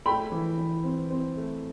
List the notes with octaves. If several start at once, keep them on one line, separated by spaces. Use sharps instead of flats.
A3 G5 B5
E3
E3
C4
C4
A3